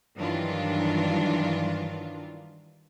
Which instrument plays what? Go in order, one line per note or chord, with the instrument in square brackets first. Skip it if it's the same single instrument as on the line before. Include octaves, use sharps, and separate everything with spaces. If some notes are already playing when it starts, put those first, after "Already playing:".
[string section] G2 D#3 E3 F#3 D4 F4